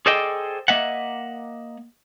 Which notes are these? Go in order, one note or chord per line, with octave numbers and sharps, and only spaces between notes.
G#4 A4 C5 D5 D#5 G5
A#3 D#5 E5 F#5